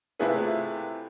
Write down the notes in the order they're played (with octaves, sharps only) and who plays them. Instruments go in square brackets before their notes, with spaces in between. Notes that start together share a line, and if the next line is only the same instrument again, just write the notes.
[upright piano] C3 A3 E4 F4 G#4 B4